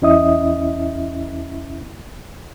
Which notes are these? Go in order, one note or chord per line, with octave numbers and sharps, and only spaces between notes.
E2 C#4 E4 D#5 E5 D#6